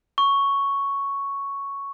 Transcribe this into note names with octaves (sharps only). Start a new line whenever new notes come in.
C#6